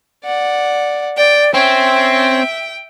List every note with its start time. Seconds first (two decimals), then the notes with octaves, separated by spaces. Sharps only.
0.24 D5 F#5
1.17 D5 G5
1.54 C4 C#4 E5 G5